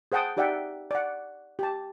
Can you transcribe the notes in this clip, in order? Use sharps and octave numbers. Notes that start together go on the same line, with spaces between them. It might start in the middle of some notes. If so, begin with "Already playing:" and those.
G#4 C5 F#5 G5 A5 D#6
D#4 G4 D5 E5 F#5 G5
D5 F#5
G4 A5